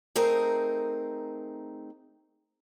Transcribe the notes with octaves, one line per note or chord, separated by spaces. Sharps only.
A3 C4 D#4 G#4 A#4